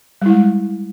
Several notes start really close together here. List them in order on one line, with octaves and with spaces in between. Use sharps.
G3 E4 G#3